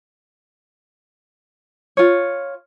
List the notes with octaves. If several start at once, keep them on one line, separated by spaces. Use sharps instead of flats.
F4 C#5